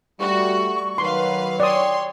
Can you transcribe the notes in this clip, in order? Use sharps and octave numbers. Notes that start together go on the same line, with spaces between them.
G3 A3 F#4 C#6
D#3 F#3 B4 F5 C6
C#5 D5 G5 C6 D#6